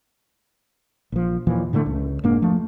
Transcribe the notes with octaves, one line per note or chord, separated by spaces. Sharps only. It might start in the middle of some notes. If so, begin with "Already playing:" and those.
A#1 F3
D#2 A#2 E3 F3
A2 D3 F#3 A3
C#2
F1 G#2 A#3 D4
F3 A3